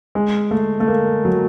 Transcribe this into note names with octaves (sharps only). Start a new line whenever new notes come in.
G#3
A3
A3
A#3
F#3